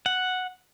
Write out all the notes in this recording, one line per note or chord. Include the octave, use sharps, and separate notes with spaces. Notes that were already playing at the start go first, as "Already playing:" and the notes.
F#5